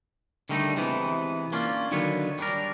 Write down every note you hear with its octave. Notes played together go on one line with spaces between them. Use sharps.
D3 D#3 G3 A3 D#4
C3 E3 G#3 B3
A#3 C#4 D4 F4
D3 D#3 F#3 B3 C#5
G3 D4 A#4